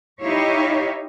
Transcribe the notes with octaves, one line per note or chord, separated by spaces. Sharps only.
D#4 E4 G4 C#5 D#5 F5